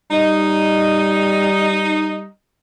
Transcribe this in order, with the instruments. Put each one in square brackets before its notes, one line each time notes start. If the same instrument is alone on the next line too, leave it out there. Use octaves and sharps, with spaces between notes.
[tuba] G3 [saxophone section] D#4